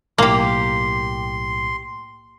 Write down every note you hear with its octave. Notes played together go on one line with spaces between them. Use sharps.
B1 A2 A#3 G4 A#5 C6